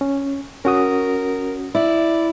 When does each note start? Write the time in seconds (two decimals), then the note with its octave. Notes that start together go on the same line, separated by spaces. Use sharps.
0.01 C#4
0.65 C#4 F#4 A#4 D#6
1.75 E4 D5